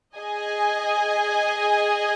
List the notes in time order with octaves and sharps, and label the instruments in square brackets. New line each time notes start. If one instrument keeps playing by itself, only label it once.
[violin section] G#4 D#5 G#5